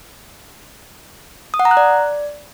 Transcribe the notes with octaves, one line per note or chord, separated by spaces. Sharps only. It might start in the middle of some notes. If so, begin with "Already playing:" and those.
D#6
F#5
A#5
F#6
D5